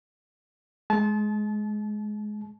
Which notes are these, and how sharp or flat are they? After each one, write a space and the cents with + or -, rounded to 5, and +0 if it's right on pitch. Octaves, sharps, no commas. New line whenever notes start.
G#3 +20 A5 -30